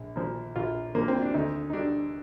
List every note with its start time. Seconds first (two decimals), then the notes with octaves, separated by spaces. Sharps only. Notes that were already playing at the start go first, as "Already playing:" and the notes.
Already playing: A#1
0.16 A#2 F3
0.56 A#1 F4
0.95 A#2 F3 A#3
1.08 C4
1.21 D4
1.34 D2 D#4
1.70 D#4
1.73 D3 G3 D4